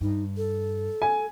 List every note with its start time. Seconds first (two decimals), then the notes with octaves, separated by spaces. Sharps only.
0.01 G2 D#4
0.37 A4
1.02 G#5